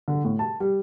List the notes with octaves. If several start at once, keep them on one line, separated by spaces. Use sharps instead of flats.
D3
A2
A5
G3